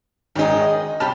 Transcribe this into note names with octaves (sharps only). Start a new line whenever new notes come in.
G#1 D#3 D#4 G#4
D#5
C3 G3 G4 A5 F6